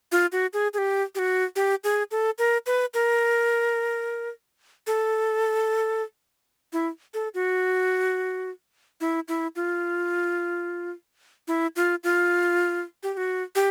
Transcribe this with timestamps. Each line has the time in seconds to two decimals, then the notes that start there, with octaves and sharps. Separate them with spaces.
0.12 F4
0.32 F#4
0.53 G#4
0.74 G#4
0.78 G4
1.15 G4
1.19 F#4
1.56 G4
1.84 G#4
2.11 A4
2.38 A#4
2.66 B4
2.94 A#4
4.87 A4
6.73 E4
7.14 A4
7.34 F#4
9.01 E4
9.28 E4
9.56 F4
11.48 E4
11.76 F4
12.04 F4
13.03 G4
13.14 G4
13.17 F#4
13.55 G4